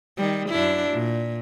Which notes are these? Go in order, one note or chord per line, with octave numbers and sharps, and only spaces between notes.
D#3 G3
F#2 D4 E4
A#2